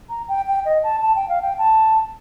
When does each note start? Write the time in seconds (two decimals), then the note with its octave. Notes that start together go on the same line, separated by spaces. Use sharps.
0.09 A#5
0.28 G5
0.47 G5
0.65 D#5
0.83 A5
1.02 A5
1.15 G5
1.29 F5
1.42 G5
1.58 A5